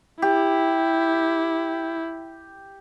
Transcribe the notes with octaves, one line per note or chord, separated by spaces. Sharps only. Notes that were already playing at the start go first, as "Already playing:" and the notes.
E4 G4